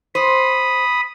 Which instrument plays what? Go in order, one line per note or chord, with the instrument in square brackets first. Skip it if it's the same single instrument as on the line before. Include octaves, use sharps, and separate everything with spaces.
[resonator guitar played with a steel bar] C5 [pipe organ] B5 D#6